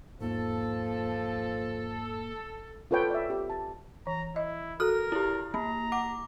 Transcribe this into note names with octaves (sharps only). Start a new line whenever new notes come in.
E2 G#2 F3 A#3 A4
F4 A4 B4 C#5 G5
D5 E5
G4
A5
E3 A#5
E4 D#5
F#4 A4 A#4 F6
E4 G4
A#3 A#5 B5
F#5 D6